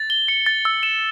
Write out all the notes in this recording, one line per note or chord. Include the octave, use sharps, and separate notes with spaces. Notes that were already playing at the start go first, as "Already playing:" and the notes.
Already playing: A6
G7
C#7
A6
E6
E7